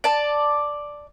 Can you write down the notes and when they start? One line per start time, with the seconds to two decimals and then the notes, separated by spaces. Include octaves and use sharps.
0.04 D5 A5